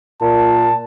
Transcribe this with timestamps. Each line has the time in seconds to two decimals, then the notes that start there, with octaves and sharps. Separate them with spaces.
0.22 A#2 A5